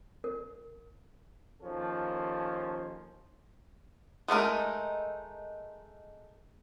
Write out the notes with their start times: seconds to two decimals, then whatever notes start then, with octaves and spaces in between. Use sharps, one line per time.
0.24 A#4
1.62 D#2 F3 C#4 A4
4.28 G#3 A3 D#4 A#4